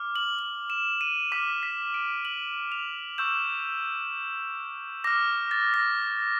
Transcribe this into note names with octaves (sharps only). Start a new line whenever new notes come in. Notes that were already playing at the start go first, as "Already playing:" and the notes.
Already playing: D6 F6
F#7
F#7
E7
D#7
D6 F6 B6
B6
D7
F#7
F7
C#6 E6 G6 E7
D6 F6 A#6
A6
A#6